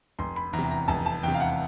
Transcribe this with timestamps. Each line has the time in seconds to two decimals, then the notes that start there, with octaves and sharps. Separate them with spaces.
0.19 F1 C6
0.36 B5
0.53 E2 A#5
0.58 C3
0.71 A#5
0.88 F1 A5
1.06 A5
1.23 E2 C3 G5
1.35 F5
1.40 F#5